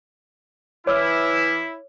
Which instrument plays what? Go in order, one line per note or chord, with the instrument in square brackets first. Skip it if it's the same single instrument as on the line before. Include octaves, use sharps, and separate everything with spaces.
[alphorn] E3 [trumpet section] E4 [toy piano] C#5 [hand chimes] D6 E6 F6